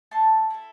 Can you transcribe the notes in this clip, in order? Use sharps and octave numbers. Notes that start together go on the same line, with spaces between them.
A3 A5 C6
E4 A4